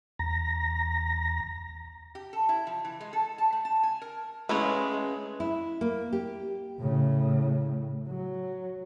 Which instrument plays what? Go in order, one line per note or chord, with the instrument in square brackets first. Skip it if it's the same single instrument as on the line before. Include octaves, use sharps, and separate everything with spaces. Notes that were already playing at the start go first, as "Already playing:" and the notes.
[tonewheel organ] E2 A#5 A#6
[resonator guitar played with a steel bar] G4
A4
E4
F3
E3
G#3
A4
A5
A3
A5
G#5
A#4
[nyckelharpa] G#3 [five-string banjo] A3 E4 C#5 [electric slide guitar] C#4 B4
[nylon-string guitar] E4
A#3
G4
[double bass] A2 C#3
F#3